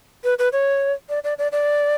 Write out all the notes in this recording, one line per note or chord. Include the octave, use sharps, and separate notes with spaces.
B4
B4
C#5
D5
D5
D5
D5